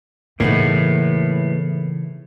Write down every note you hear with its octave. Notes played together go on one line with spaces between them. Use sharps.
A2 C#3 E3 A#3 B3 D#4